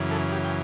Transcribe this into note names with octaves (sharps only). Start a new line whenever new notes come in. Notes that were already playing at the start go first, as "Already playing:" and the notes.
Already playing: F#2 C#3 E3
A4
G4
G5